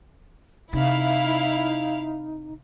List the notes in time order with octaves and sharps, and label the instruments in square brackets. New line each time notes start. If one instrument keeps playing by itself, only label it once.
[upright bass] C3 [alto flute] D#4 [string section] E4 F5